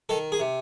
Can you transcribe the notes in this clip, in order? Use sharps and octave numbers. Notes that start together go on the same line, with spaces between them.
D#3 A4
G#4
C3